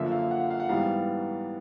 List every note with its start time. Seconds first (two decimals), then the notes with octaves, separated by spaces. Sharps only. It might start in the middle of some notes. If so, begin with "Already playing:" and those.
Already playing: F#2 D3 F3 A#3 E5
0.12 F5
0.31 F#5
0.40 F5
0.50 F5
0.60 F#5
0.69 G#2 E3 G3 B3 F5